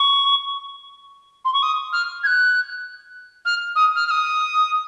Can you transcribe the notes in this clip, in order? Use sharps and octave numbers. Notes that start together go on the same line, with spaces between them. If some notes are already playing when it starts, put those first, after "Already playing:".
Already playing: C#6
C6
C#6
D#6
F6
G#6
F#6
F6
D#6
F6
F6
D#6